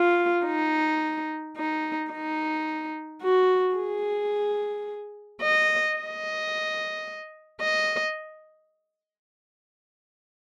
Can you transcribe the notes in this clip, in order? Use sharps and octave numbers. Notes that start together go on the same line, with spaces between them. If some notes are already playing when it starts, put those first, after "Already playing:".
Already playing: F4
D#4
D#4
D#4
F#4
G#4
D#5
D#5
D#5